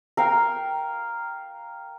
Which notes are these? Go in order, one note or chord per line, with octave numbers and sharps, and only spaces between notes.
A#4 F5 G5